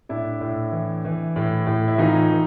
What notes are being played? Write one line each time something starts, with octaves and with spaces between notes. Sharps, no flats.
A2 D4 E4
A2
E3
E3
A2
A2
E4
E3 D#4 F4
E3